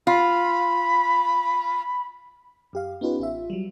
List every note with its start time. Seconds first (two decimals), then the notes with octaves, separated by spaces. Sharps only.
0.07 F4 B5
2.73 F#2 G4 F5
3.01 B3 C#4 D#4 F4 G4 B4
3.19 A1 F4 E5
3.50 F#3 G3